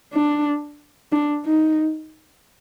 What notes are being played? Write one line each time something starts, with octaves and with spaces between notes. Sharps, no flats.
D4
D4
D#4